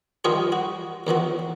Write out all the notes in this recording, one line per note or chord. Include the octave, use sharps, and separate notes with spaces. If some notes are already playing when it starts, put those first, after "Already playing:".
D#3 F3 G3 G#3 F4 G#4
F#4
E2 D#3 F3 F#4